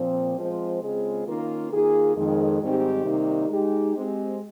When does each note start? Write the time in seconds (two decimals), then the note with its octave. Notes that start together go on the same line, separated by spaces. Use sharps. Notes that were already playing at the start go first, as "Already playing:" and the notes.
Already playing: A#2 F3 C4
0.38 F3 G#3 C4 F4 C5
0.82 C#3 G#3 C4 F4 G#4
1.27 D#3 A#3 C#4 F4 A#4
1.71 D#3 A#3 F4 G#4
2.16 F2 D#3 G#3
2.61 G#2 D#3 G3 C4 G4
3.05 C3 D#3 G3 A#3 D#4
3.49 G#3 D#4 G4
3.95 G#3 C4 G4